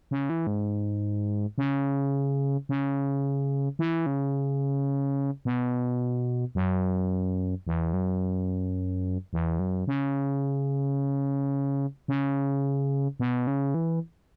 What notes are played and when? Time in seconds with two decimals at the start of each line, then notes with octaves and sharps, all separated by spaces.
0.11 C#3
0.30 E3
0.47 G#2
1.58 C#3
2.69 C#3
3.79 E3
4.06 C#3
5.45 B2
6.55 F#2
7.67 E2
7.93 F#2
9.33 E2
9.59 F#2
9.87 C#3
12.08 C#3
13.20 B2
13.47 C#3
13.74 E3